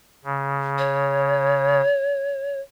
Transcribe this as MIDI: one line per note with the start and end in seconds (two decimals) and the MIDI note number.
0.25 1.82 49
0.78 2.60 73